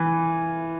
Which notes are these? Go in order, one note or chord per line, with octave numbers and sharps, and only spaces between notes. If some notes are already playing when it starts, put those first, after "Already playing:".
Already playing: E3